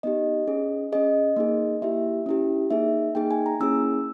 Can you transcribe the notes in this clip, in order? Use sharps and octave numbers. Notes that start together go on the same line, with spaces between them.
B3 D#4 G4 D#5
C#4 G#4
C#4 G#4 D#5
A#3 D#4 G#4
A#3 E4 G4 E5
C#4 E4 G4
A#3 D#4 G#4 E5
A#3 D#4 G#4 G5
G#5
A#5
A#3 C#4 E4 G#4 E6